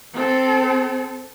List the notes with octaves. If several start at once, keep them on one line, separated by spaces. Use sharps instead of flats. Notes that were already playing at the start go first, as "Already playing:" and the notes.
C4 A4